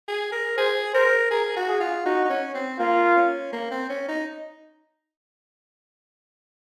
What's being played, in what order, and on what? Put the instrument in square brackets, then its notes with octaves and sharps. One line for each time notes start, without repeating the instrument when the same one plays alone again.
[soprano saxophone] G#4
A#4
[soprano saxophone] G#4 [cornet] C5
[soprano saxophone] A#4 [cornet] C5
[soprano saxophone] G#4 [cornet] A#4
[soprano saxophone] F#4
[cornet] G#4
[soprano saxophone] F4
[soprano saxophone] D#4 [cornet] F#4
[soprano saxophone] D#4
C#4
C4
[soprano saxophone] A#3 [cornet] F4
[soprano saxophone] C#4
A#3
C4
C#4
D#4